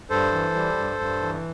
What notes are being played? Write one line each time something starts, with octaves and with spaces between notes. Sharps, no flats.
G2 A4 C5
E3
G3
G2
G2
E3